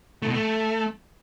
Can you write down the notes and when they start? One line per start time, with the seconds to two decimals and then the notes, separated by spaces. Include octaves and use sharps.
0.22 A3
0.28 B2
0.33 A3